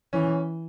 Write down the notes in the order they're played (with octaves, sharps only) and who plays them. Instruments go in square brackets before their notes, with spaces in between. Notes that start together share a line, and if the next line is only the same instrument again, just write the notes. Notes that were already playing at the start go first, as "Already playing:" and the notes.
[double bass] E3 [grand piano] C#4